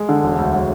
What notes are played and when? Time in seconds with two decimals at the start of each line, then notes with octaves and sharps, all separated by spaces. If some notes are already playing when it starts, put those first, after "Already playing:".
Already playing: G#3
0.09 D3
0.23 E1
0.38 D2
0.53 F#3